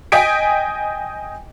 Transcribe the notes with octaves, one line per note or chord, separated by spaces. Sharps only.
D#5 G5 G#5 B6 D7